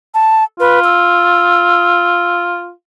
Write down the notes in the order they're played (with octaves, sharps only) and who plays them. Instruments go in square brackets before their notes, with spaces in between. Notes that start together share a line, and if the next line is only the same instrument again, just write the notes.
[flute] A5
[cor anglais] F4 [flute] B4
[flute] E6